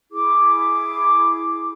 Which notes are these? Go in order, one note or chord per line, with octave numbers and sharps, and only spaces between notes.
E4 G#4 D6